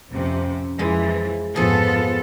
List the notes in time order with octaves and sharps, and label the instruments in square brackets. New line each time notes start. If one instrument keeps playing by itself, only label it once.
[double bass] F2 C#4 [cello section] C3
[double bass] F2 F3 [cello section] E3 [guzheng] G#3
[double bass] F2 G#2 [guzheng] F3 G#4 [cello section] B3 F4 A4